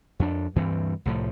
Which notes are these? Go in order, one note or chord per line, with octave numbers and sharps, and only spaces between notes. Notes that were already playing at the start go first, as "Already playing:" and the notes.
F2 D4
D2 G2 E3 C4
C2 A2 F3